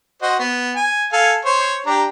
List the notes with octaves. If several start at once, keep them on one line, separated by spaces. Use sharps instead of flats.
F#4 C5 D#5
B3
G#5
A4 F5 G#5
C5 C#5
D4 G4 A#5